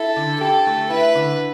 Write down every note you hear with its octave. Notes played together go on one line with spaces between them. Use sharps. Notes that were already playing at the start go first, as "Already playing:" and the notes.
Already playing: E4 A4
D3
G4 A4
A3
E4 B4
D3